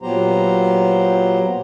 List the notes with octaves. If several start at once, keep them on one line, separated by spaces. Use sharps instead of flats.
A#2 F#3 B3 G4 C5 A#5